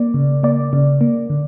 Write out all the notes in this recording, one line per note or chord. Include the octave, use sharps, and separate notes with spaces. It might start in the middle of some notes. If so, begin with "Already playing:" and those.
Already playing: A#3 D5
C#3
A#3 D5
C#3
A#3
D3